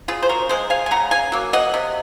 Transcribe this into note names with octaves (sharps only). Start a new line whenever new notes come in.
C#3 F4 G#4
C5
F#4 A#4
G#3 G#4 C5
F5 G#5
G#5
C#3 F#5 A#5
F5 G#5
F#3 A#3
D#5 F#5
C3